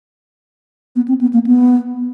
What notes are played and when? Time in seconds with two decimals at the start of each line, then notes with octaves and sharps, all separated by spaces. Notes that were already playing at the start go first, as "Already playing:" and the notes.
0.96 B3
1.08 C4
1.21 B3
1.33 A#3
1.46 B3